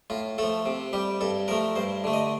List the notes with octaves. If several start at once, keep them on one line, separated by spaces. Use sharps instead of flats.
A2 F4
F3 A3 A4
C3
G3 G4
G2 A4
F3 A3 A#4
G2 C5
D3 A3
D#5